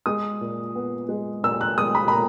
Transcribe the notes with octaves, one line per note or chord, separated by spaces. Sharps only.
G#3 D#6
A#2
B3
G#3
A#2 E6
F#6
G#3 D#6
B5
B5
A#2 A#5